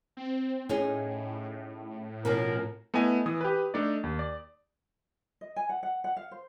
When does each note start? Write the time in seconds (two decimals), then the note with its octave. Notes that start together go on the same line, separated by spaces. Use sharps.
0.17 C4
0.69 A2 C#4 D#4 G#4
2.25 B2 F3 C#4 A#4
2.94 A3 B3 E4 D#5 G#5
3.26 E3 D#6
3.41 G4 B4
3.74 A3 D4 D#4 D5
4.04 D#2
4.19 D5
5.41 D#5
5.56 G#5
5.69 F#5
5.83 F#5
6.04 F#5
6.16 F5
6.31 C5